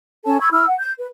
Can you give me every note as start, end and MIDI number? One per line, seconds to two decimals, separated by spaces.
0.26 0.40 61
0.26 0.40 69
0.26 0.40 73
0.26 0.40 81
0.40 0.49 83
0.40 0.49 85
0.40 0.49 88
0.40 0.49 92
0.52 0.64 64
0.52 0.64 83
0.52 0.64 88
0.52 0.64 89
0.66 0.74 78
0.80 0.91 91
0.98 1.07 71